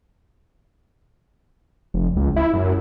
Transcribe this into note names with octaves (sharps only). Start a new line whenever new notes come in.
F1
C#2
E4
F#2